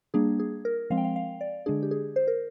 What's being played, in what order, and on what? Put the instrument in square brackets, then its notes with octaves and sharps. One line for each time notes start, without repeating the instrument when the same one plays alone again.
[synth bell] G3 A#3 D4 G#4
G#4
A#4
F3 G#3 C4 F5
G5
F5
F5
D5
D3 G#3 D4 G#4
G4
G#4
C5
A#4